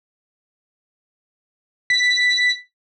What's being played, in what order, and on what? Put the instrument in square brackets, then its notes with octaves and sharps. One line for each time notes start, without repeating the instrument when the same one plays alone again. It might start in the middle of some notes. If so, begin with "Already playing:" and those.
[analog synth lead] B6